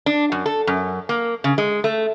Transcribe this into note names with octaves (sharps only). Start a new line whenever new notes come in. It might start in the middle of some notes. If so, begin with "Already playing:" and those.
D4
F#2
A4
F#2
A#3
C#3
G#3
A3